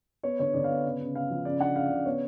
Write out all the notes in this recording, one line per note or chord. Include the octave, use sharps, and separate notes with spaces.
B3 C#5
D3 C#5
D3 D5
F5
B3
C#3
C#3
C#3 F5
F3
C#3 D5
D4 F#5
C#3 F5
C#3 D5
B3 C#5